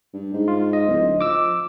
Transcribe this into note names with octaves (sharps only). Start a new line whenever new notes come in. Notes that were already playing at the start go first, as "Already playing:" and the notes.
G2
G#2
F4
D#5
D1
F3 D6 E6